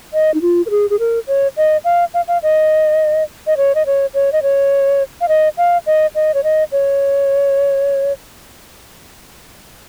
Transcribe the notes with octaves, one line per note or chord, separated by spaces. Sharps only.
D#5
D#4
F4
A#4
G#4
G#4
A#4
C#5
D#5
F5
F5
F5
D#5
D#5
C#5
D#5
C#5
C#5
D#5
C#5
F5
D#5
F5
D#5
D#5
C#5
D#5
C#5